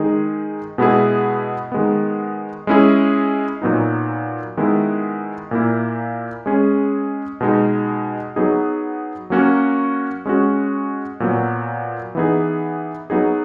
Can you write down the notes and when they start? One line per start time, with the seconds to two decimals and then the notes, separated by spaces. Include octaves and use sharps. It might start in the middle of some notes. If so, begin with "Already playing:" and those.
Already playing: D#3 G#3 D#4 G#4
0.78 B2 G#3 B3 E4 G#4
1.72 D#3 G#3 B3
2.67 G#3 C#4 E4 G#4
3.62 A#2 F#3 B3 D#4
4.57 D#3 G#3 B3 E4
5.51 A#2 A#3 E4
6.46 G#3 C#4 G#4
7.41 B2 G#3 D#4
8.36 F#3 B3 D#4 G#4
9.30 F#3 A#3 C#4 F#4
10.26 G#3 C#4 F#4
11.20 A#2 F#3 B3
12.15 E3 B3 D#4 G#4
13.10 F#3 B3 D#4 G#4